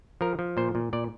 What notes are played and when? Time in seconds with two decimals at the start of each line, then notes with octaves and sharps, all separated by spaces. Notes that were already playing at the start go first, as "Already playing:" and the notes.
0.21 F3 A#4
0.39 F3
0.57 A#2 C5
0.75 A#2
0.93 A#2 D5